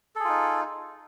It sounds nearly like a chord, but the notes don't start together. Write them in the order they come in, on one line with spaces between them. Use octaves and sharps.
A4 G#4 F4 D#4